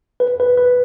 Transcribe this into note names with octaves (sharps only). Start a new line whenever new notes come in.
B4
B4
B4